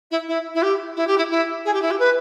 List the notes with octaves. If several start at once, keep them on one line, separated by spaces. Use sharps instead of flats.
E4
E4
E4
G4
E4
G4
E4
E4
G#4
G4
E4
G4
B4